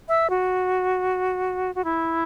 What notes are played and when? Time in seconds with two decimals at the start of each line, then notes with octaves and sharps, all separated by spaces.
0.08 E5
0.30 F#4
1.75 F#4
1.84 E4